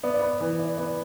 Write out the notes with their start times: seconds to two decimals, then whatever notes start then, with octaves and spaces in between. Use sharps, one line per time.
0.03 B3 D5
0.14 D5
0.22 B4
0.40 E3 B4
0.59 D5
0.78 B3 D5